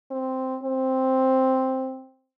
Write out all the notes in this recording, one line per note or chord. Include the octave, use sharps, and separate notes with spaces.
C4
C4